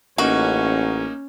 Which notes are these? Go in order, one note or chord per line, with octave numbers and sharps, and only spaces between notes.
A1 A#3 C#4 D#4 F#4